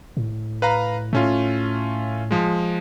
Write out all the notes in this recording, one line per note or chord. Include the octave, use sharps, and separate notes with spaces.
A2
B4 F5 A#5
A2 A3 C#4 F4
F3 G#3